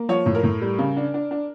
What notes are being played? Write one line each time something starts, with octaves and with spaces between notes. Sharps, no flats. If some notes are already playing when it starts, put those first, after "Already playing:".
Already playing: A#3
F3 C#5
A2
A#4
A2
G3
C#3
D4
D4
D4